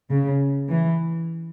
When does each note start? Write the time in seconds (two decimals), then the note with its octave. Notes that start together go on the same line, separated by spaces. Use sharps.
0.11 C#3
0.70 E3